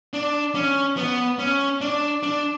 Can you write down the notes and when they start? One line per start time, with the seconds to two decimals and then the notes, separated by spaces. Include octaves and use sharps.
0.14 D4
0.55 C#4
0.97 B3
1.39 C#4
1.81 D4
2.23 D4